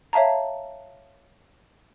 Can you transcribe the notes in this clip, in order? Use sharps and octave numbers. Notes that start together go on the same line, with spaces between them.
C#5 E5 F5 A5 A#5